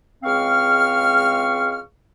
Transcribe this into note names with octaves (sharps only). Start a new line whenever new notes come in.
C#2 G#3 C4 F5 C#6 F6